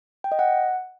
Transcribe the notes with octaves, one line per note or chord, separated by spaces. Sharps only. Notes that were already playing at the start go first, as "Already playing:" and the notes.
G5
D#5
F#5